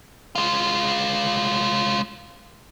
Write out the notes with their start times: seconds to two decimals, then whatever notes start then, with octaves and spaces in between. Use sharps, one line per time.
0.35 G#3 F4